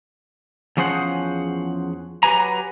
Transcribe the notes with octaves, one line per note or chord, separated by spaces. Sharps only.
E2 F3 C#4 G#4 C5 F#5
F#3 G4 B4 G#5 A#5